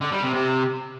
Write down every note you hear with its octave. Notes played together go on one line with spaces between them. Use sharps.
D3
G3
C3
C3